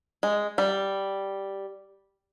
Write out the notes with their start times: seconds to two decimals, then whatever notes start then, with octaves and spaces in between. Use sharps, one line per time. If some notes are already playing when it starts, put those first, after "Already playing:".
0.23 G#3
0.58 G3